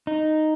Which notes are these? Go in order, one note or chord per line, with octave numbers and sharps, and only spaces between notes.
D#4